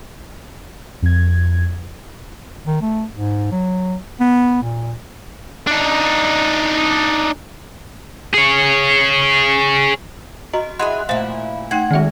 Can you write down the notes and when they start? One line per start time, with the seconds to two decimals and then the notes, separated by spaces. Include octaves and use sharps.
1.02 F2 G#6
2.67 D#3
2.81 A3
3.15 G#2
3.52 F#3
4.20 B3
4.62 A#2
5.67 D4 D#4
8.33 G#4 C#5
10.54 F#4 D#5 A#5
10.79 E4 G#4 D#5 F#5 G#5 C6 F#6
11.09 A#2 A3 E4 C5 F5
11.71 A3 D#4 F#5 G5 G#6
11.91 D#3 G#3 G#4 E5